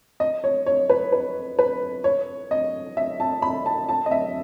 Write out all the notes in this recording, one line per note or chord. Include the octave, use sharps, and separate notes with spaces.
D#5
C#5
C#5
B4
B4
B4
C#5
D#5
E5
A5
B5
A5
A5
D#5
E5